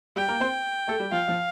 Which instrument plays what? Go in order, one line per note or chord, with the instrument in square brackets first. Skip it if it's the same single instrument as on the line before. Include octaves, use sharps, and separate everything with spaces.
[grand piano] G3 G4 [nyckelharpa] G5
[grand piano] A#3 A#4
C4 C5
A3 A4
G3 G4
[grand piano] F3 F4 [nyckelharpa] F5
[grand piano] F3 F4